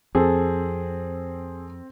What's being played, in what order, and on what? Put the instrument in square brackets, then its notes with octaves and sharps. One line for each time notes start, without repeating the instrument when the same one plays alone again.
[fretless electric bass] F2 [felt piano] C4 [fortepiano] G#4 A4